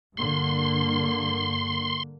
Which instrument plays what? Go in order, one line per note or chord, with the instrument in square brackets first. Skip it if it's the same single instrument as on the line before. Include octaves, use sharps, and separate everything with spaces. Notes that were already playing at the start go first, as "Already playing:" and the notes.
[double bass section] G2 D3 A#3 [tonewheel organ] C6